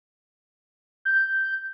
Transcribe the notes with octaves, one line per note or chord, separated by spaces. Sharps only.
G6